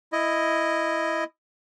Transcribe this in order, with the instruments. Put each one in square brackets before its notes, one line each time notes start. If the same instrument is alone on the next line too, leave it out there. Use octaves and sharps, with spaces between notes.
[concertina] E4 D#5